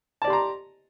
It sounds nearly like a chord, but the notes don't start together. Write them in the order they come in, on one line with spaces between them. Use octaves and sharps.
A5 D5 G4 C6 A#5